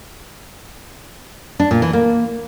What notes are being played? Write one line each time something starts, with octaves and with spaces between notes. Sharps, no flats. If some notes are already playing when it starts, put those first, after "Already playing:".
D4
A#2
E3
A#3